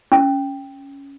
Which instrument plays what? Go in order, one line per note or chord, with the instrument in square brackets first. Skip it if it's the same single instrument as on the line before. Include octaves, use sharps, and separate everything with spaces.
[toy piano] C#4